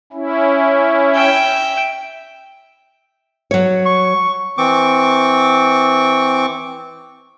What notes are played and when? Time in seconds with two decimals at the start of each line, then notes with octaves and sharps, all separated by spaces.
0.13 C#4 E4
1.15 E5 G5
3.51 F#3 C#5
3.86 C#6
4.58 E3 C4 C#6 D6